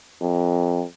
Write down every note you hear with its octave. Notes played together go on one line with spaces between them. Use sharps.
F2